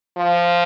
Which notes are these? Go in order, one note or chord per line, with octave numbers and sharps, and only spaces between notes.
F3